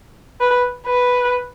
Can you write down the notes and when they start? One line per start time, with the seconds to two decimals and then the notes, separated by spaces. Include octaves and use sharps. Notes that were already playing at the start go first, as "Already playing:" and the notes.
0.40 B4
0.87 B4